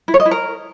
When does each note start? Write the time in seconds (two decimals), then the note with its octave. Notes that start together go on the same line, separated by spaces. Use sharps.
0.08 E4
0.14 C#5
0.20 D#5
0.26 E4
0.31 A#4